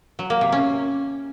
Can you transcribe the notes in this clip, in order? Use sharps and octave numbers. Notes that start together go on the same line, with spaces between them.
F#3
A#3
C3
C#4